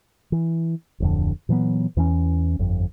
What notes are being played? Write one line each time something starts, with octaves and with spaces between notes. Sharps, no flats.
E3
D1 F2 D3
A#2 E3 F#3 B3
E2 E3 B3 C#4
G1 F2